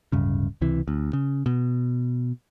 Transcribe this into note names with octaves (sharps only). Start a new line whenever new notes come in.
D1 G2 C#3
C#2 C3 E3
D2
C#3
B2